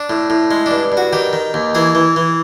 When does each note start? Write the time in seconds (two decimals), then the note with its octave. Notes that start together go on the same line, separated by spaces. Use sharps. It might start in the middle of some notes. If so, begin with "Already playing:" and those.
Already playing: D4
0.10 A2
0.30 A2
0.51 G#3
0.66 G2 D4
0.92 G2
0.97 F#4
1.13 D#3 G4
1.33 D#3
1.54 D#2
1.75 E3 G#4
1.95 E3
2.16 E3